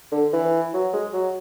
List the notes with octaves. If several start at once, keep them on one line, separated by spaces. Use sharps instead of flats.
D3
E3
F#3
G#3
F#3